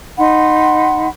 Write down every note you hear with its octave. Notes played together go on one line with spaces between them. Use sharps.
D#4 F#5 B5 C6